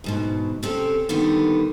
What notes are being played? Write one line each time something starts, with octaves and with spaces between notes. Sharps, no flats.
D2 G#2 B2
C3 C4 C#4 A4
D3 D#3 G3 B3 F#4